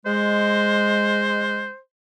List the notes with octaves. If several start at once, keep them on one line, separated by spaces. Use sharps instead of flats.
G#3 C5